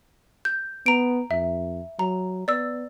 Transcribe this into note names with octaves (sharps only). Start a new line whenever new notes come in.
G6
B3 A#5 D7
F2 E5
F#3 A#5
B3 D5 E6